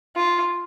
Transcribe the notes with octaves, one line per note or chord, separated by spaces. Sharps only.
F4